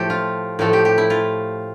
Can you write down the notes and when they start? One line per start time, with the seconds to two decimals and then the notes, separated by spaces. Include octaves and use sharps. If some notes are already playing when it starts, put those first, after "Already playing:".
Already playing: A2 F3 A3 G4 A4
0.10 F4
0.59 A2 F3 A3 A4
0.73 G4
0.85 G4
0.98 E4
1.10 F4